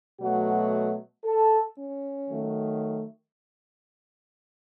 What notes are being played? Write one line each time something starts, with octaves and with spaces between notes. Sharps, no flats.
B2 F#3 A3 F#4
A4
C#4
D#3 F#3 A3